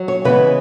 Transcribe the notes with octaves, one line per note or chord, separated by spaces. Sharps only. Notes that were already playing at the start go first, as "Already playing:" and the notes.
Already playing: F#3
C#5
C#3 E3 G#3 B3 B4